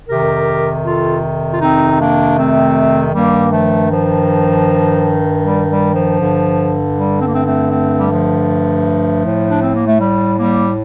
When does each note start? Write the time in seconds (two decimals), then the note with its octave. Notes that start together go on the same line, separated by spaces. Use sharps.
0.08 F2 C3 D#3 G4 A#4
0.85 F4 A4
1.52 F4
1.61 C4 D#4
1.90 C4
1.99 A#3 D4
2.37 A3 C4
3.13 G2 D#3 G3 A#3
3.52 F3 A3
3.90 F3
5.42 G3
5.68 G3
5.93 F3
6.19 G2 D3
6.94 G3
7.20 C4
7.27 A#3
7.34 A3 C4
7.46 A3 C4
7.71 A3 C4
7.99 G3
8.10 F3 A3
9.24 A2
9.49 D4
9.62 C4
9.74 A#3
9.87 A3
10.00 G3
10.38 G3 A#3